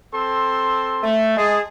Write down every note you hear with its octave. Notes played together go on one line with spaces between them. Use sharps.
C4 A4 C6
A3
G#3 G#4 A5